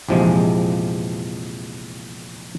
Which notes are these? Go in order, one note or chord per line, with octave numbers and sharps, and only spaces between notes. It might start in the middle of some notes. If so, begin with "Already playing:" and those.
A#1 E2 C3 F3 G#3